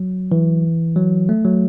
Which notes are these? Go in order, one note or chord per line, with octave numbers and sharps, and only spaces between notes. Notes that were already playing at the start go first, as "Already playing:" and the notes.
Already playing: F#3
E3
F#3
A3
F#3